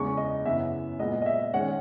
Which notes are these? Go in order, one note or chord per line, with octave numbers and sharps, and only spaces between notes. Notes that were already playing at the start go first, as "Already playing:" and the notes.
Already playing: E2 C#3 G#3 C#6
D#5
F#2 C#3 E3 B3 E5
A#2 G#3 B3 D#5
D#5
E5
D#3 G#3 C#4 F#5